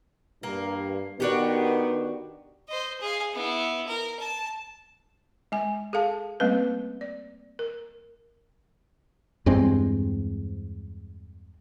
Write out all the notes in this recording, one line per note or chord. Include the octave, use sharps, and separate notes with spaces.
G2 A#3
D#3 B3 D4 F#4 G4
C5 D#5
G#4 F5
B3 E4
A#4
A5
G#3 G#5
G#4 A4 F5 A5
G3 A3 A#3 C4 C#4 B4
D5
A#4
E2 G2 G#3 C4